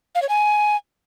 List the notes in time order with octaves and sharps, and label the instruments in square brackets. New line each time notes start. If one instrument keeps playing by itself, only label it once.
[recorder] F5
C#5
G#5